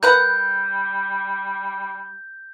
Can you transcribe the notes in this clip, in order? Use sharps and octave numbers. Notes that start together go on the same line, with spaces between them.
G3 A#4 B4 F#5 G6